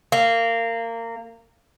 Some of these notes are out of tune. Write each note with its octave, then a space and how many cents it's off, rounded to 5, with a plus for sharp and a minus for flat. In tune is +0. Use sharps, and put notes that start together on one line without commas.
A#3 -25